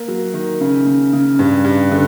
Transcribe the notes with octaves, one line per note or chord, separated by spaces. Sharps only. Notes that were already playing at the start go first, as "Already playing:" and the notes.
Already playing: A#3
F#3
D#3
C#3
C#3
C#3
G2
G2
D3